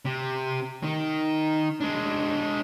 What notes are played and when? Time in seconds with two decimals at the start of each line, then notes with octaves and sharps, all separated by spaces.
0.05 C3
0.83 D#3
1.81 G#3 D4